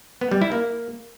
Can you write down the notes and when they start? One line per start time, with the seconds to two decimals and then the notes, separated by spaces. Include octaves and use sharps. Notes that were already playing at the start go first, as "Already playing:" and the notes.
0.21 B3
0.31 G3
0.42 E4
0.52 A#3